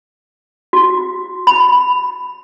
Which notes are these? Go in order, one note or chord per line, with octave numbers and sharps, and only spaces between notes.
F#4
B5